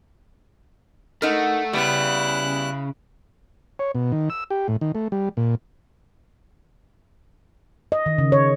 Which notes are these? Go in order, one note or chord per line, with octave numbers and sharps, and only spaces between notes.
A3 D#4 A#4 F#5 F6
C#3 G3 B3 E4 F#6
C#5
B2
D#3
E6
G4
A2
D#3
A3
G3
A#2
D#5
D#3
C#3
C#5